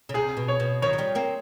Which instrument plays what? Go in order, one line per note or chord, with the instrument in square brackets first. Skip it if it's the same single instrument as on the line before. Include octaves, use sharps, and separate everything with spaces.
[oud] C#3
[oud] C3 [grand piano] G#4
[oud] B2
[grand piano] C#5
[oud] B2
[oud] D#3 F3 [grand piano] C#5
[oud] F#3
F3 G3
A#3 C4